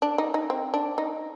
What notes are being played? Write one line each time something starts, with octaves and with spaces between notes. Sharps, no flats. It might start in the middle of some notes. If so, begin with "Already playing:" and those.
D4
D#4
D#4
C4
D4
D#4